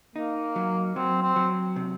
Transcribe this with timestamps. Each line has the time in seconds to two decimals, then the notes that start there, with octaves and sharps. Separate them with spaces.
0.16 A#3 D#4
0.56 F#3
0.96 F#3 C4
1.23 C4
1.36 F#3
1.76 C3